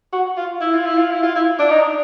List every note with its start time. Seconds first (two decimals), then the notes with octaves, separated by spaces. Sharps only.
0.13 F#4
0.37 F4
0.61 E4
0.74 F4
0.86 E4
0.98 F4
1.11 E4
1.23 F4
1.36 E4
1.59 D4
1.70 D#4
1.81 D4